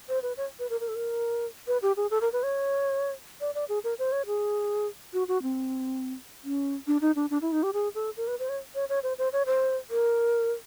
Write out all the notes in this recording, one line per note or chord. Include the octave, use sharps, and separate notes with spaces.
C5
B4
C#5
B4
A#4
A#4
A4
A#4
B4
G4
G#4
A4
A#4
B4
C#5
D5
D5
G#4
A#4
C5
C#5
G#4
F#4
F#4
C4
C#4
D4
D#4
D4
D4
E4
D#4
G4
G#4
A4
A#4
B4
C5
C#5
C#5
C#5
C5
C5
C#5
C5
A#4